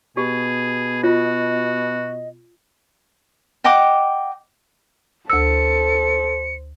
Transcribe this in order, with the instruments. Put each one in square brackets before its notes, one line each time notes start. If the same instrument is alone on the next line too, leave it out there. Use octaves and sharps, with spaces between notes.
[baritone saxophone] B2 [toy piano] G4 [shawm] G#4
[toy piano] F4 [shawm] F#4 [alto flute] D#5
[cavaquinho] D#5 F#5 G5 D6
[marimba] D2 E6 [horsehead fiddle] A4 [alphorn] C5 [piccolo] C#7